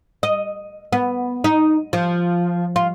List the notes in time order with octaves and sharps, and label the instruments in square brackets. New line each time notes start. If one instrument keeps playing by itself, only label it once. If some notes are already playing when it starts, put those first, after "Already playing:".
[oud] D#5
B3
D#4
F3
F4